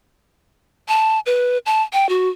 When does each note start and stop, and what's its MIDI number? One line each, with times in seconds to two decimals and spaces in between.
0.88 1.20 81
1.26 1.58 71
1.66 1.83 81
1.93 2.08 79
2.09 2.29 66